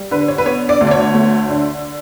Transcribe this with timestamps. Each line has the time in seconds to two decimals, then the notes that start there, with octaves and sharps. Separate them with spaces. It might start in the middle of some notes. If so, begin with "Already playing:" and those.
Already playing: G3
0.11 D3 B4
0.28 C#5
0.38 B4
0.45 B3 C#5
0.69 D5
0.81 D2
0.87 D5
0.91 C#5
1.14 A3
1.49 D3